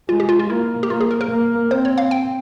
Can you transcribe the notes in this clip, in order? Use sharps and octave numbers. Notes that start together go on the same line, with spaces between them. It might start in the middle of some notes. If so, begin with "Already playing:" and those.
G#3 F4
G4
F4
F4
A#3 E4
G4
A#3 F4
G#4
A#4
A#4
A#3
C4 C5
C#5
F5
G5